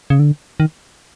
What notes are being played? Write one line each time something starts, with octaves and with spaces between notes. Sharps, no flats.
C#3
D3
D#3